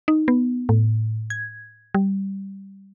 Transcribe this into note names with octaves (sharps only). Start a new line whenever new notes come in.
D#4
B3
A2
G#6
G3